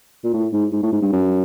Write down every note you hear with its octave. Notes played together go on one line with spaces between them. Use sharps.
A#2
A2
G#2
G#2
A2
G#2
G2
F#2